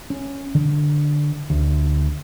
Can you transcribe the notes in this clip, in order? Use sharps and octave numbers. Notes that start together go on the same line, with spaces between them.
C#4
D3
D2